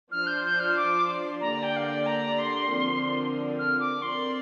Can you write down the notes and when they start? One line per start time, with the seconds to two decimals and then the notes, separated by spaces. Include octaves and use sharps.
0.11 F3 D4 F4 C5 F6
0.27 G6
0.44 G6
0.60 F6
0.77 D6
1.41 D3 A#3 G4 D5 A#5
1.63 G5
1.76 F5
1.84 G5
2.06 A#5
2.39 C6
2.71 D3 F3 C4 A#4
3.59 F6
3.80 D6
4.02 C4 A#4 D5 C6